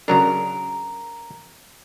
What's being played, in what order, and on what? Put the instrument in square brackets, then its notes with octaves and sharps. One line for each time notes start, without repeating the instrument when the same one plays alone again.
[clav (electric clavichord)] C#3 F#3 D4 [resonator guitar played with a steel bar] A#4